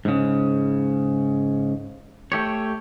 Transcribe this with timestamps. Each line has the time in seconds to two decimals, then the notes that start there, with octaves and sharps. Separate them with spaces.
0.05 G#2 C#3
2.32 A3 G4 C#5